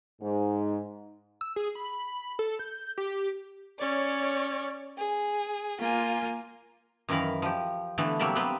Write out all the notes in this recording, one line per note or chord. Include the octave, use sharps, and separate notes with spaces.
G#2
E6
G#4
B5
A4
G6
G4
C#4 C#5 D5
G#4
A#3 F4 G#5
F#2 D#3 E3 A#4 F5 B5
F3 G4
D3 E3 A3 B3
C3 F#3 G3 A#3 A5 B5
B3 C4 G4 B4 C5